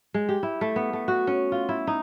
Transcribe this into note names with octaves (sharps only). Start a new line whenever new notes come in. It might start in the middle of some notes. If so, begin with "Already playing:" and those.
G#3
G4
E4
A3
B3
A3
F#4
C#4
F4
E4
D#4